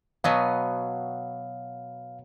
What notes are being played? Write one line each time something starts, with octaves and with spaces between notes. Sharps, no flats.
B2 F#3 B3 F5